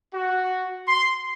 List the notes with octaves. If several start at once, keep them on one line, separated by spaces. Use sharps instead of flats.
F#4
C6